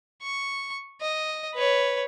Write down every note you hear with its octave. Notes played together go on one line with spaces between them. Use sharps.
C#6
D#5
B4 C#5